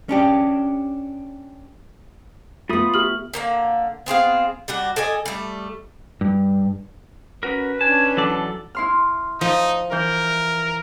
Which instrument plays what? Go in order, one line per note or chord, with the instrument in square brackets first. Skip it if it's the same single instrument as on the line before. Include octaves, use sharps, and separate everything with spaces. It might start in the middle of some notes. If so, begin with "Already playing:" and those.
[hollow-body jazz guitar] C#4 D4 G4
[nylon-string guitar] A3 B3 [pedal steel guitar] F4 B5 D#6
[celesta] G4 F6 F#7
[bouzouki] D3 A#3 F5
B3 C4 G#4 F5
G3 D4 F#4
A4 D5 D#5 G#5
G3 A3
[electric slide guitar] G2
[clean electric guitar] C#4 F#4 A#4 [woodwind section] B4
[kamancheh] C#4 D4 [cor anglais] G#5 [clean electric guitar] A5
[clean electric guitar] E3 F#3 D5 [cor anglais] A4
[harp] E4 C6 F6
[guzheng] F3 [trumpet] D#4
[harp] E3 G6 [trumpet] A#4